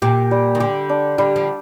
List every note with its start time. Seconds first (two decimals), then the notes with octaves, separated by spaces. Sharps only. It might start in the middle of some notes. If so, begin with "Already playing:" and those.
0.02 A#2 G4
0.31 G3
0.55 D#3
0.60 D3 G4
0.89 D4
1.18 D3 G3
1.36 F3